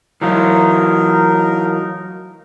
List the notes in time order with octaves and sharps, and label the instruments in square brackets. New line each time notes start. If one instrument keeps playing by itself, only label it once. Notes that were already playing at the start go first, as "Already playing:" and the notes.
[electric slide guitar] E3 F#3 F4 [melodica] D#4 A#4